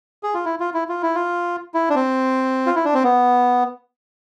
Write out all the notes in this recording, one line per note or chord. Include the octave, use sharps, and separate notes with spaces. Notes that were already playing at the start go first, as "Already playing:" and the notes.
G#4
F4
E4
F4
E4
F4
E4
F4
E4
D4
C4
F4
E4
D4
C4
B3